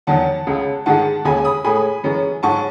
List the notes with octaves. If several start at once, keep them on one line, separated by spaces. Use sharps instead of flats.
E2 D#3 F#3 F#5 A5
C#2 C#3 G#3
G#2 D#3 G#3 F#5 A5
D#2 C#3 G#3 G#5 B5
B5 D#6
A2 G#3 G#5 B5
F#2 E3 G#3
G#2 F#3 A5 C#6